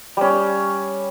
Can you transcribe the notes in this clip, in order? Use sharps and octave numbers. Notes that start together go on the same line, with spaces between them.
G3 C#4